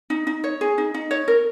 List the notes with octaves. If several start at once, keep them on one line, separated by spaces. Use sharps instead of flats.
D#4
D#4
C#5
G#4
D#4
D#4
C#5
A#4